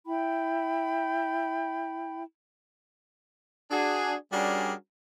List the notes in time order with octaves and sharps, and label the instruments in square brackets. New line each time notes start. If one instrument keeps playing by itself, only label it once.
[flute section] E4 G5 B5
[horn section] D4 F#4 G#4
G3 C#4 D4 F#4 G#4 A#4